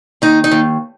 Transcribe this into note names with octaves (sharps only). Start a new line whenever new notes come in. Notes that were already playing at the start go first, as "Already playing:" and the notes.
D#2 D#4
D#4
D#2